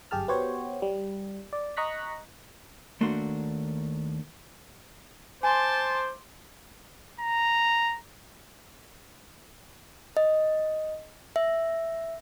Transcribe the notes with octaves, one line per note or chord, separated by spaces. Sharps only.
G1 F#2 G4 G#4 A5 F6
B3 F#4 G4 C5 C#5
G3
D5
D#5 A#5 C#6 F#6 A#6 B6
D#2 A3 A#3 D4 F#4 C6
C5 G#5 A5 C6 D6
A#5
D#5
E5